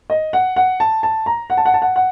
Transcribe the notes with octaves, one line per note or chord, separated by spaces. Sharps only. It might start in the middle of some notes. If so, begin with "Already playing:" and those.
D#5
F#5
F#5
A5
A5
A#5
F#5
A5
F#5
A5
F#5
F#5